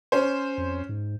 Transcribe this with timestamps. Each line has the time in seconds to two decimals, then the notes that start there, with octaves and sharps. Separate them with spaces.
0.12 C#4 C5
0.58 F2
0.89 G#2